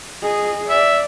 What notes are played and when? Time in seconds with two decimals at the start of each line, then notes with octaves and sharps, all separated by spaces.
0.22 G#4 D#5
0.69 D5 E5